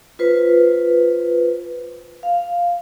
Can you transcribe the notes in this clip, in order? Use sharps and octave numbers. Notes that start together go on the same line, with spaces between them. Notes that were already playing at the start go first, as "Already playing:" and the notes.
F4 B4 C5
F5